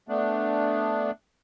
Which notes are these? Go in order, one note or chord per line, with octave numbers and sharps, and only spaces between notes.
A3 B3 D4